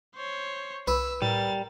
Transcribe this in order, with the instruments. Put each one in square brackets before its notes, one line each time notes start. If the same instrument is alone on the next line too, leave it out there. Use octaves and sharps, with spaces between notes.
[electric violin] C5 C#5
[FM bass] C2 [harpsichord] B4 [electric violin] E6
[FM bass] A2 [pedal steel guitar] G3 [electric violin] A#4 A6